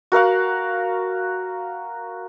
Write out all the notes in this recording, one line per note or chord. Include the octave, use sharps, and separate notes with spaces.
F#4 A#4 F5 F#5